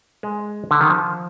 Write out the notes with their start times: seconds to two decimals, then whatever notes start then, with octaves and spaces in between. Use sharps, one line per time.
0.23 G#3
0.71 D3
0.81 D#3
0.90 F3